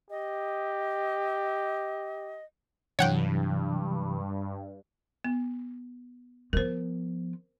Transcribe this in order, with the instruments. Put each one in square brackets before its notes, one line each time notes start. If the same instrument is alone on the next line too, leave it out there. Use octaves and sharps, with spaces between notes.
[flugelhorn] G4 [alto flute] D#5
[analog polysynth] G2 [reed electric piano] C3 E3 F#3 [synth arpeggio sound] C#5 F#5 G5
[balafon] B3
[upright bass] F3 B3 [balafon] A#4 C5